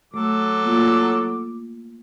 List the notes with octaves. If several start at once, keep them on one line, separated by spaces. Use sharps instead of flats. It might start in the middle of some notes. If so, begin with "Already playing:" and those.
F#3 A3 A4 D6
A#3 F4